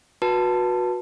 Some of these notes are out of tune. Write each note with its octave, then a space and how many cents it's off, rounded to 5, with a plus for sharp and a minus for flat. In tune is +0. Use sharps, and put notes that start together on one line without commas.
F#4 -25 B4 -25 A5 +10